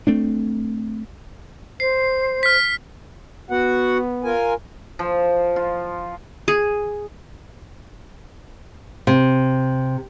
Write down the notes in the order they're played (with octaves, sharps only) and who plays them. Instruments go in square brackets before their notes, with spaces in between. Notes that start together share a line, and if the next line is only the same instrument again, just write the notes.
[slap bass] A3 C4 D4
[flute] C5 [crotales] C7
[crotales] F6 B6
[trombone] B3 [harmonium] F#4 F#5
[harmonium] F4 A#4 G#5
[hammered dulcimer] F3
F4
[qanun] G#4
[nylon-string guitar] C3